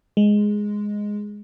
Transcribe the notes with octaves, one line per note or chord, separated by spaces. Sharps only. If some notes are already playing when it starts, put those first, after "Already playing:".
G#3